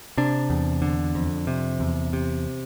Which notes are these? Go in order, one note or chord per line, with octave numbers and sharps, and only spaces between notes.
C3 D4
E2
D3
F2
C3
E2
C3